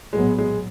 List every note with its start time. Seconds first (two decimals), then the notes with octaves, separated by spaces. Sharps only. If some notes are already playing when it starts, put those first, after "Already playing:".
0.13 A#1 A2 F#3 G#3 B3
0.38 G#3